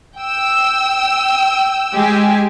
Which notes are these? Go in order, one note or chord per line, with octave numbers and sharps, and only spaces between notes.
G5 E6
G#3 G4 G#5